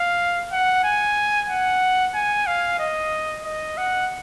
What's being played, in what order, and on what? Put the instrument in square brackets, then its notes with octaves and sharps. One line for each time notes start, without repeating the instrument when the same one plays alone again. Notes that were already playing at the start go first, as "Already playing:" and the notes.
Already playing: [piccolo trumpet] F5
F#5
G#5
F#5
G#5
F5
D#5
D#5
F#5